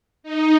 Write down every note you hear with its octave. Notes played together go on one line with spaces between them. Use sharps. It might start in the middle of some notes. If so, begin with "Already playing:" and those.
D#4